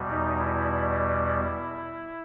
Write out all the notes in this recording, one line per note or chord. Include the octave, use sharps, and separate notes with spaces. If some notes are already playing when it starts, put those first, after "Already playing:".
Already playing: E2 B2 G3
D#4
E4